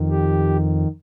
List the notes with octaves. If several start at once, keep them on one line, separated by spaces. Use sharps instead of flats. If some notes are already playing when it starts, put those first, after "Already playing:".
Already playing: F2 D#3
G4